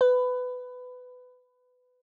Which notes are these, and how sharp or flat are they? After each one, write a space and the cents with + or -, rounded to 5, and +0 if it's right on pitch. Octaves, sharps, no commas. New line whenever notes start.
B4 +20